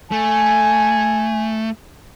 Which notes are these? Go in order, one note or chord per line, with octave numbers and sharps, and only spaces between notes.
A3 G#5